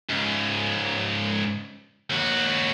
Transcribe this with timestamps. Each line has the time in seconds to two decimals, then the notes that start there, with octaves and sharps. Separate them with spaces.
0.09 C#2 G#2
2.10 D#2 F#4